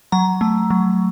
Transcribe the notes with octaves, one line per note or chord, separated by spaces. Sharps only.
F#3 A#5
A3
F#3